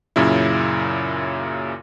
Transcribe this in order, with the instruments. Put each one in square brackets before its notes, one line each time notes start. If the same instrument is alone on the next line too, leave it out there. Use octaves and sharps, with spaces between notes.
[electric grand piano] F#2 A#2 C#3 E4